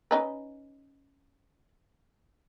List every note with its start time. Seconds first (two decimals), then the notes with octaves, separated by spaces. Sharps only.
0.11 C#4 D#4 B4